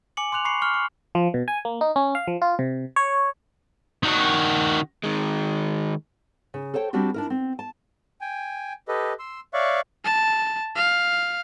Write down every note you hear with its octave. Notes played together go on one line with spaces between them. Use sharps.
G#5 D6 C#7 F#7
C6 D6 F#6 F7
B5 C#6 C7 C#7
C#6 F6
C#6
F3
B2
G#5
A#3
D#4
C#4
F5
F3
F4
C3
C#5
D#3 F#4
D#3 G#3
C#3
A4 C5 C#5 G5 A5
G3 C4 D4 F#4 G4
D4 E4 A#4
C4
A5
G5 G#5
G4 A4 B4 D#5
C6 E6
C#5 D5 E5 F5 C#6 F#6
A5
F5